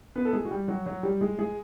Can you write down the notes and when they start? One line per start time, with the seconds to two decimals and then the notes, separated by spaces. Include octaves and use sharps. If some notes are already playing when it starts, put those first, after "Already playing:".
0.15 B3 B4
0.25 A4
0.33 G#3 G#4
0.45 F#4
0.51 G3 G4
0.68 F#3 F#4
0.86 F#3 F#4
1.03 G3 G4
1.21 G#3 G#4
1.39 G#3 G#4